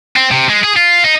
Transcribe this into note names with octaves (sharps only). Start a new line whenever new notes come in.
C4
C3
G#3
G#4
F4
D#4